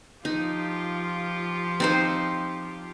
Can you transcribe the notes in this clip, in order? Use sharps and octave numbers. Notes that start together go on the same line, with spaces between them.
F3 D#4 F4 G4
C4 D#4 C5